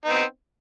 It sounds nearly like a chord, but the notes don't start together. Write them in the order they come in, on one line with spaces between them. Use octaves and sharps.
D#4 B3 C4